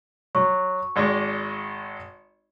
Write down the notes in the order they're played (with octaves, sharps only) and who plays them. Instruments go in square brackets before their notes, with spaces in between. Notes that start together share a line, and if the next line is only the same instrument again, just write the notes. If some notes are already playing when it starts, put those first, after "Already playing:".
[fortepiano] F#3 [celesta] C#6
[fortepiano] G#1 G#3 D5